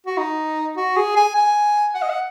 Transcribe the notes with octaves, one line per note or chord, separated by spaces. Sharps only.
F#4
D#4
F#4
G#4
G#5
G#5
F#5
D#5
F#5